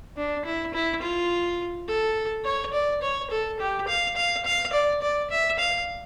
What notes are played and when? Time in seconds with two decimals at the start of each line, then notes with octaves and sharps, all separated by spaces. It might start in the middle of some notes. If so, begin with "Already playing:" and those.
0.17 D4
0.45 E4
0.74 E4
1.02 F4
1.88 A4
2.45 C#5
2.73 D5
3.02 C#5
3.30 A4
3.60 G4
3.88 F5
4.16 F5
4.45 F5
4.73 D5
5.02 D5
5.30 E5
5.59 F5